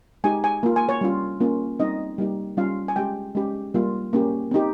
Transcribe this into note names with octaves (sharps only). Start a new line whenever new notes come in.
G#3 D#4 G4 G#5
G#5
A#3 F4
G#5
C#5
G3 C#4 F4
A#3 C#4 F4
G3 C4 D#4 D#5
G3 A#3 D#4 G4
G3 C#4 F4 F5
G#5
G#3 C#4 G4 G5
G#3 C#4 G4
G3 A#3 F4
A#3 C#4 G4
C4 D#4 G4